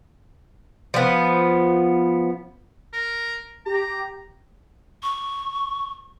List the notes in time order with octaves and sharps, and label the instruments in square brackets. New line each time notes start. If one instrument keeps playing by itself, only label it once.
[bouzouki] F3 B3
[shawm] A#4
[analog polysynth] G4 [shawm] A#5
[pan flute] C#6